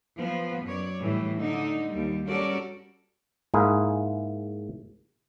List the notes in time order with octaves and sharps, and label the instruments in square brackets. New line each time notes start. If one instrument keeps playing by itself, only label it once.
[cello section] F3 B3
F#2 C#5 D5
A2 E3 G3 A3
D3 D#4
D#2 G3
G3 C#4 F#4 A4 A#4 D5
[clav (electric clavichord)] G#2 A#3 E4 G#4